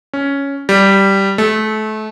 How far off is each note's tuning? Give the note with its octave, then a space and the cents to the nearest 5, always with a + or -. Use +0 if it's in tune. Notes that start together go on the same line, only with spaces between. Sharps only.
C#4 +5
G3 -5
A3 -30